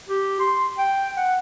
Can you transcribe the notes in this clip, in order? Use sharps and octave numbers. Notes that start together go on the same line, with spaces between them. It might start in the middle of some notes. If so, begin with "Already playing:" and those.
G4
C6
G5
F#5